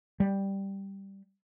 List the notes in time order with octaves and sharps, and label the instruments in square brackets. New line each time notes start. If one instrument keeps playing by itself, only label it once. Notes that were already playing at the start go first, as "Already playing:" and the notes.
[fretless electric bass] G3